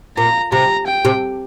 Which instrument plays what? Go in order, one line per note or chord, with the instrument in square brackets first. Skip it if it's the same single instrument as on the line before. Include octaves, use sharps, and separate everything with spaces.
[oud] A#2 [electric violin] A#5
[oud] C3 [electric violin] A#5
[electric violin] G5
[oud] C3